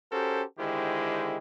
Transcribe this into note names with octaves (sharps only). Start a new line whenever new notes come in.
C#4 F#4 G4 A4 A#4 C5
D3 D#3 G#3 E4 G4 C5